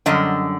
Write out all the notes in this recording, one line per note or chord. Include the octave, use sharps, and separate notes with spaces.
F#2 D3 G3 D#5